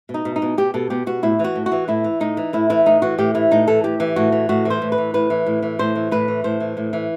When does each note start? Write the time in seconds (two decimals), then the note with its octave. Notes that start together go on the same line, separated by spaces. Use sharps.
0.09 B2
0.14 D#4
0.25 B2
0.36 D#4
0.42 B2
0.58 B2 G4
0.74 B2 A4
0.90 B2 G4
1.07 B2 F#4
1.23 A2 E4
1.39 E3 F#4
1.55 A2
1.66 F#4
1.72 E3
1.88 A2 E4
2.04 E3
2.20 A2 D#4
2.37 E3
2.53 A2 E4
2.70 E3 E4
2.86 A2 D#4
3.02 E3 F#4
3.18 A2 G4
3.35 E3 E4
3.51 A2 D#4
3.67 E3 A4
3.84 A2 G4
4.00 E3
4.16 A2 F#4
4.32 E3
4.49 A2 F#4
4.65 E3 C5
4.82 A2
4.92 B4
4.98 E3
5.14 A2 B4
5.30 E3
5.46 A2
5.62 E3
5.79 A2 C5
5.95 E3
6.11 A2 B4
6.28 E3
6.44 A2 C5
6.60 E3
6.77 A2
6.93 E3